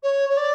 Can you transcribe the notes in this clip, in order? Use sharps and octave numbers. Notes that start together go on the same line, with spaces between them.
C#5
C#5
D5